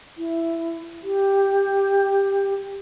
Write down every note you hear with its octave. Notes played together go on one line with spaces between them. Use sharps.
E4
G4